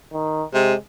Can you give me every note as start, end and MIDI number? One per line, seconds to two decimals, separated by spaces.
0.13 0.44 51
0.54 0.74 48
0.54 0.77 56